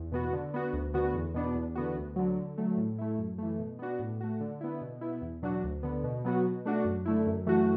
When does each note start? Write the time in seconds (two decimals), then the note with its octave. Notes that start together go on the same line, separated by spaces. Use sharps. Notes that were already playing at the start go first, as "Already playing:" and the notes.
Already playing: E2
0.12 B2 B3 F#4
0.33 D3
0.54 B3 F#4
0.73 D2
0.94 D3 B3 F#4
1.14 E2
1.34 B2 B3 D4
1.55 E2
1.75 D3 B3 F#4
1.95 D2
2.16 D3 F#3
2.36 D3
2.58 F#3 A3
2.77 A2
2.98 A3 E4
3.18 F#2
3.38 E3 A3
3.59 B2
3.79 B3 D4 F#4
3.99 A2
4.21 A3 F#4
4.41 D3
4.61 B3 E4
4.81 B2
5.01 B3 E4
5.22 E2
5.42 B2 F#3 D4 F#4
5.64 D2
5.83 D3 B3
6.04 B2
6.25 F#3 B3 F#4
6.44 B2
6.66 A3 D4 F#4
6.85 F#2
7.05 D3 A3 E4
7.27 F#2
7.46 E3 A3 F#4